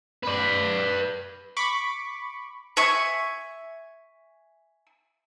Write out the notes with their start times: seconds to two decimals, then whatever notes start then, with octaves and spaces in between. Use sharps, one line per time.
0.24 B4 D5
1.57 B5 C#6 D6
2.77 E5 G#5 C#6